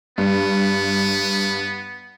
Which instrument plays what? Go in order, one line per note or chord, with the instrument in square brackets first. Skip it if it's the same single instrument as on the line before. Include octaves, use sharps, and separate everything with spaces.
[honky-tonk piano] G2 [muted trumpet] B3